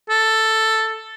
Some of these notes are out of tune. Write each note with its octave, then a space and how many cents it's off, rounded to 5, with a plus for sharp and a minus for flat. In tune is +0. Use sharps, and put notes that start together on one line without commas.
A4 +5